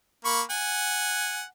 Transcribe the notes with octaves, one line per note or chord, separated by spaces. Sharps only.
A#3 B5 C#6
F#5 G#5